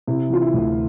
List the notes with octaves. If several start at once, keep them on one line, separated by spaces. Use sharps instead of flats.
C3 E4
E3 F4
E4
D2